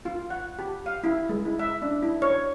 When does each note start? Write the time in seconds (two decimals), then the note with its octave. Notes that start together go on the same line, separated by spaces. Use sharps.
0.05 F4
0.30 F#5
0.59 G4
0.86 F5
1.04 E4
1.29 G#3
1.45 E4
1.59 E5
1.82 D4
2.02 E4
2.22 C#5